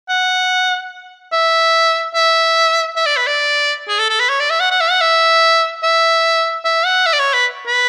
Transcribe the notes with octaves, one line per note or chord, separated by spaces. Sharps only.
F#5
E5
E5
E5
D5
B4
D5
G#4
A4
A4
B4
C#5
D5
E5
F#5
F#5
E5
F#5
E5
E5
E5
F#5
E5
D5
C#5
B4
B4